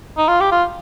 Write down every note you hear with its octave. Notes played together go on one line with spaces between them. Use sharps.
D#4
F4
G4
F4